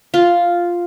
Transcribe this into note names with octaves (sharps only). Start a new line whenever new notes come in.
F4